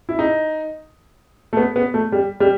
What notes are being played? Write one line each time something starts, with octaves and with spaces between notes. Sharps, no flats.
E4
D#4
A3
B3
B3
A3
G3
G3